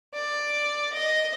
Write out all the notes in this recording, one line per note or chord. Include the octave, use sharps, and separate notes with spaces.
D5
D#5